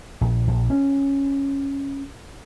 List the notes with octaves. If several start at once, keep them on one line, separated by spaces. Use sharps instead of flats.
A#1
A#1
C#4